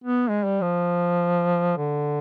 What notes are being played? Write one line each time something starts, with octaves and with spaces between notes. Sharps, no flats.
B3
G#3
G3
F3
D3